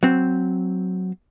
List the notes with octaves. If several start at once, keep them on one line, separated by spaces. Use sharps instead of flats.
F#3 C4